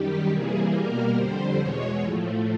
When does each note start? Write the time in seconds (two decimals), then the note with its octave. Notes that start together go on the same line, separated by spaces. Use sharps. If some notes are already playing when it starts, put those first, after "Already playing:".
Already playing: F#2 D#3 G3 G4
0.31 C3 E3 G3 A#3 G#4
0.72 B2 G3 A#3 A#4
1.15 F2 D3 G3 C5
1.58 E2 B2 G#3 C#5
2.01 A2 F3 A3